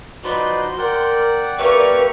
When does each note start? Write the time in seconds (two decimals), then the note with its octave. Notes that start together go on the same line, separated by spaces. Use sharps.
0.24 F3 D#4 F#4 B4 C5 D5 C6
0.78 A#4 D5 F#5 G5
1.59 A#3 G4 B4 D5 E5 C#6 F6